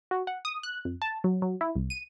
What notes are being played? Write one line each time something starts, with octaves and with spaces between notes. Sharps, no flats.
F#4
F#5
D#6
F#6
F2
A5
F#3
F#3
E4
C2
D#7